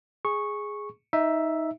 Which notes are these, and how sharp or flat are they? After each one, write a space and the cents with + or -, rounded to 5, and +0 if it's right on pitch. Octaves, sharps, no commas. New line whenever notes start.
G#4 +0 C#6 -10
D#4 +15 E5 +0